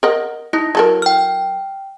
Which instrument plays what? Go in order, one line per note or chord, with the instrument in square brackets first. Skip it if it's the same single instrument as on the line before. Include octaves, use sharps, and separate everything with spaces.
[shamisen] A#4 D#5 F#5
[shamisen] D#4 [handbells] E4
[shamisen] F#3 A4 A#4
[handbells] G5 F6